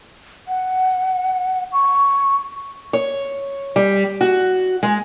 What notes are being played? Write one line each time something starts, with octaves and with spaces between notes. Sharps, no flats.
F#5
C#6
C#5
G3
F#4
G#3